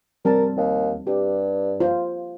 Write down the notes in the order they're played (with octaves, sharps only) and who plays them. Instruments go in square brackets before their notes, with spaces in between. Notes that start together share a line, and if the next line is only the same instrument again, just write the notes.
[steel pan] G3 C4 A5 [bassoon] A#4
[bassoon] D#2
[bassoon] G2 [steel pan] G4
[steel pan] F4 C5